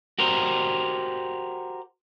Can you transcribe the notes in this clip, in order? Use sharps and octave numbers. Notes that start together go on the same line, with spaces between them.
F#4 G4 A#4 C5